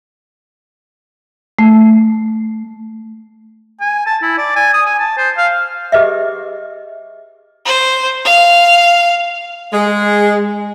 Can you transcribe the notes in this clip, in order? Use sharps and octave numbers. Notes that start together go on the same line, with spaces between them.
A3
G#5
A5
E4
D5
G#5
D#6
G#5
A5
C5
F5
G4 G#4 B4 D#5 E5
C5
F5
G#3